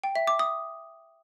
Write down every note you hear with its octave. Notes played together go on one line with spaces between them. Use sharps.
G5
E5
D6
D#6